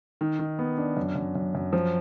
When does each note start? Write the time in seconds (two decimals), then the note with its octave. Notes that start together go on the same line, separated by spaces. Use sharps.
0.21 D#3
0.39 D#3
0.59 B3
0.78 D4
0.97 F#2
1.15 F#2
1.35 F#2
1.55 F#2
1.73 F3